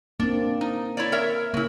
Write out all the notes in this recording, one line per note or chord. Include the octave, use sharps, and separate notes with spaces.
A#3 C4 D4
D#4
E4 C#5 D5
A#4 C#5 E5
C#3 A#3 E4